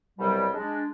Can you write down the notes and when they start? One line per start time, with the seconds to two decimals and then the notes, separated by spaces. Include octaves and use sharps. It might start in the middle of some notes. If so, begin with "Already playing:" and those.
0.19 C2 B2 F#3 G3
0.54 G#3 D4